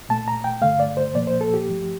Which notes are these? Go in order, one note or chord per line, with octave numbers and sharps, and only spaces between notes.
A#2 A3 A5
A#5
G5
G2 D3 A3 F5
D5
C5
A#2 F3 A#3 D5
C5
A4
G4
G2 F3 A3